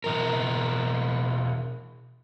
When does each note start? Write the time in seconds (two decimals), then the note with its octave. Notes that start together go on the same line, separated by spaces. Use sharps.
0.04 B2 E3 A#4